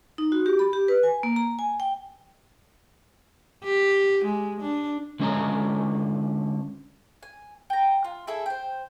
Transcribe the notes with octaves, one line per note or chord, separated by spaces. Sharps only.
D#4
F#4
G4
B5
G4
B4
G#5
A#3
A#5
G#5
G5
G4
G#3
D4
D3 G#3 C#4 C5 D#5 A#5
G#5
G5 A#5
F4
E4 G#4 A4 E5
C5 G5